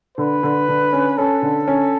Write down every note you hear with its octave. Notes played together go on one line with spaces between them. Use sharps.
D3 B4
D3
D3
C#4
C#4 A4
D3
C#4